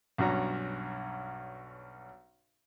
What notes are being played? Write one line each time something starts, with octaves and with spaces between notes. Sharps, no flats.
B1 G2 C#4 F#4 C#5 A#5